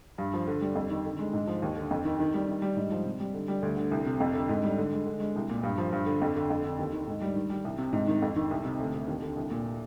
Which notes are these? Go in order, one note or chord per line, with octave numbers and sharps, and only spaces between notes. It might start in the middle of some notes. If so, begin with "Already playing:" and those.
G2
F3
D3
G3
F2
D#3
D3
G#3
G#2
F3
D#2
D3
F2
D#3
D#3
G3
D#3
G3
G#2
F3
C3
G3
D3
G3
D2
D3
C2
C3
F2
D3
G#2
G3
D3
G#3
D3
G#3
C2
A#2
G2
F3
G2
D3
F2
D3
F2
D3
D#2
D#3
G#2
G3
D#3
G3
C2
C3
G#2
D#3
F2
D#3
C2
C3
D2
C3
D#2
D3
C2
A#2